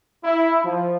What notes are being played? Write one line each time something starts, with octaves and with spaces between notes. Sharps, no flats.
E4
F3